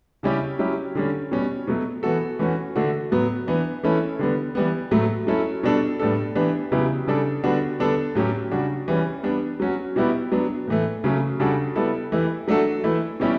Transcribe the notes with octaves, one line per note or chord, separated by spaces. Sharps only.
C#3 G3 C#4 E4 G4
F#3 C#4 E4 G4
D3 G3 C#4
B2 G3 C#4
B2 F#3 A3
E3 B3 F#4 A4
E3 A3 C#4 F#4
D3 A3 D4 F#4
A2 F#3 B3
E3 B3 D4
E3 A3 C#4 E4 A4
D3 G3 B3
E3 G3 B3
A2 F#3 A3
F#3 C#4 E4 A4
B2 G3 D4 A4
A2 G3 B3 D4 A4
E3 B3 D4 G4
C#3 F#3 B3 E4 G4
C#3 G3 D4 A4
D3 G3 B3 D4 F#4
D3 G3 B3 D4 A4
A2 F#3 C#4 G4
C#3 G3 D4 F#4
E3 G3 C#4
G3 B3 D4
F#3 C#4 F#4
B2 G3 B3 E4 G4
F#3 B3 D4
A2 E3 A3
C#3 F#3 A3 C#4
C#3 G3 D4 F#4 A4
G3 B3 E4 A4
E3 A3 E4 G4
F#3 A3 D4 F#4 A4
E3 A3 E4
B2 G3 C#4 E4 G4